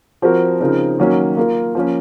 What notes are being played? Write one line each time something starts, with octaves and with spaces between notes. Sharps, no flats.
F3 C4 F#4 A#4
C#3 F3 C4 D#4 A#4
D#3 F#3 A#3 C#4 F#4
A#3 F4 A#4
F3 A#3 C#4